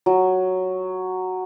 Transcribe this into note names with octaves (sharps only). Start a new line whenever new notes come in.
F#3